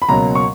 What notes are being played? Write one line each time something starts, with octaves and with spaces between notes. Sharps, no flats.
B5
C#2 B2 F#3 A#3 A#5
C#6